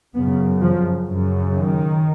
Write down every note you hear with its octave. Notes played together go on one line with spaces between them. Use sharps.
F#2 C#3 B3
F3
F#2 C#3
D#3